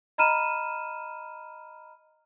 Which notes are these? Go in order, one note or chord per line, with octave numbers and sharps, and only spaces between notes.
D#5 A#5 B5 F6 D#7 E7